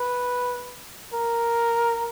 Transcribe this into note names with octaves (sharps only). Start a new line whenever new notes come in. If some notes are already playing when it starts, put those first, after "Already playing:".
Already playing: B4
A#4